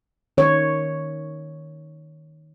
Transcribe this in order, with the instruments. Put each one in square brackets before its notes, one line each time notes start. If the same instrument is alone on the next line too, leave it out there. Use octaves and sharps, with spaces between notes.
[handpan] D#3 C#5